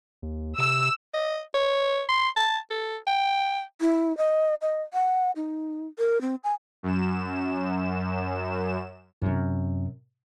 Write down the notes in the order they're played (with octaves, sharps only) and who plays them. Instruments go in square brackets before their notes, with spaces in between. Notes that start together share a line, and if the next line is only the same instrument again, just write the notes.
[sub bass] D#2
[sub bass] C3 [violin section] E6
[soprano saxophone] D#5
C#5
C6
A5
A4
G5
[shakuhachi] E4
D#5
D#5
F#5
D#4
A#4
C4
G#5
[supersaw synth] F#2 E7
[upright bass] F#2 C3